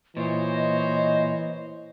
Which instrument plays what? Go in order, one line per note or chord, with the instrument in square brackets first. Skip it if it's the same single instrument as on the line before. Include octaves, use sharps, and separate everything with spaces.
[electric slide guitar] A#2 [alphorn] E3 [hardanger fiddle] C5 C#5 [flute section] D#5